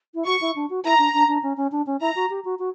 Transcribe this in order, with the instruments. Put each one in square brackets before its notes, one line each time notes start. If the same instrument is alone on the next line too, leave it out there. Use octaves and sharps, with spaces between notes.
[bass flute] E4
[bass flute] F#4 [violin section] C#6
[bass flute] E4
D4
F#4
[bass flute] E4 [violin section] A#5
[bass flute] D4
D4
D4
C#4
C#4
D4
C#4
[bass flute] E4 [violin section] A#5
[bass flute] F#4
G4
F#4
F#4